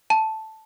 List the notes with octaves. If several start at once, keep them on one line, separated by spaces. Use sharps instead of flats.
A5